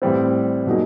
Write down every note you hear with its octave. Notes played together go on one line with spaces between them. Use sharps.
A2 E3 G3 C4
B2 F#3 A#3 D#4 G#4